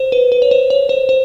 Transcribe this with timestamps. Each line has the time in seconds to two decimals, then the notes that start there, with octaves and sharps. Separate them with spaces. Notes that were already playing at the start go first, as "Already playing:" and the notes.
Already playing: C5
0.12 B4
0.32 B4
0.42 C#5
0.51 C5
0.70 C#5
0.89 C5
1.09 C5